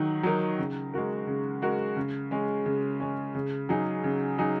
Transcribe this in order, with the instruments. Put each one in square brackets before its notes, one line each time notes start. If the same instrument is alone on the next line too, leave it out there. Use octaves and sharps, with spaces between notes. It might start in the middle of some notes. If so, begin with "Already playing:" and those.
Already playing: [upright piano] D#3 F#3 D#4
F#3 D#4 A#4
C#3
G#3 F#4 A#4
C#3
G#3 F#4 A#4
C#3
G#3 C#4
C#3
G#3 C#4
C#3
F#3 D#4 G#4
C#3
F#3 D#4 G#4